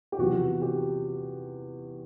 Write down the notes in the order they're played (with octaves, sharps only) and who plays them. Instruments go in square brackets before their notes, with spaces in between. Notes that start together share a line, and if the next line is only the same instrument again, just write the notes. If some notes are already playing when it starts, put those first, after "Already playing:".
[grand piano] G4
E2 C3 F3 F#4
G4